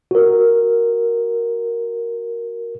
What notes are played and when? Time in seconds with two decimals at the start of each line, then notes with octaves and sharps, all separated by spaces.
0.11 F#4 A#4